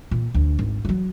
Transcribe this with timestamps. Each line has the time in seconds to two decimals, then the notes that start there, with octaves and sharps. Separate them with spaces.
0.11 A#2
0.34 D2
0.59 G#1
0.85 F3 F#3